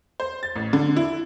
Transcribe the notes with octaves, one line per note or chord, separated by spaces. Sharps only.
C5
A6
A1
D3
E4